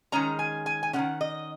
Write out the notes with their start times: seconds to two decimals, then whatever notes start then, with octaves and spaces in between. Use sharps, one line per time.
0.12 D#3 G#3 C#4 A#5
0.39 G#5
0.66 G#5
0.83 G#5
0.93 G#3 C#4 F#5
0.99 D#3
1.21 D#5